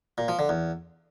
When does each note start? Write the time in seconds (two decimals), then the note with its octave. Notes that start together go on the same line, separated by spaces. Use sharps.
0.18 A#2
0.28 F3
0.39 D3
0.49 E2